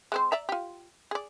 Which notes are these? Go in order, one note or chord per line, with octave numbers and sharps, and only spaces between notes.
G#3 C4 C5
D5 E5 A#5
F4 G4
G#4 D5